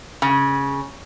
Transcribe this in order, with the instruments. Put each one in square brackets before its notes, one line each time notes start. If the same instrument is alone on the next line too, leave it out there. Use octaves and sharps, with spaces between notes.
[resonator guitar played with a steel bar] C#3